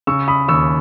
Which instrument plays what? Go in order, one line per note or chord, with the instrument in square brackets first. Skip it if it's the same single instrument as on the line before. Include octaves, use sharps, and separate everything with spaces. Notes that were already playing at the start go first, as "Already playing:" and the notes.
[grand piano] C#3 C#6 E6
B5 D#6
D#2 C#6 E6